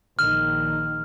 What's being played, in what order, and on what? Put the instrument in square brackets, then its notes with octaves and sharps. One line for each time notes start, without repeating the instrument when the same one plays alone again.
[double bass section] A#1 D#3 [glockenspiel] F6